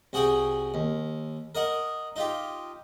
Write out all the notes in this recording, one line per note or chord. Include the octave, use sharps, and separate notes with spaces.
C2 F#4 G#4 F#5 G5
D#2
A#4 D#5 F#5
D#4 F4 G4